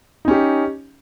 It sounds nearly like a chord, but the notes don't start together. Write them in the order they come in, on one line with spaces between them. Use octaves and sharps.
D#4 C#4 G4